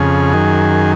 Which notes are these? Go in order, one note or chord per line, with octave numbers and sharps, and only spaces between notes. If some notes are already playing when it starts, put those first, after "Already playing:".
Already playing: F2 C#3 G#4
F#2 D#3